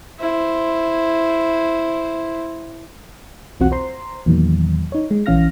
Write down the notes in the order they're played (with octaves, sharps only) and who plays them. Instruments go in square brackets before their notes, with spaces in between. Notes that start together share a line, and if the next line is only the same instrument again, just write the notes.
[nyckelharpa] E4 C5
[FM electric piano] B1 E2 C4 F4 F#4 F#5
C5 A#5 C6
E2 A#2 D#3 F#3
D#4 C#5
G#3
A#1 E3 C#4 F5 F6 A#6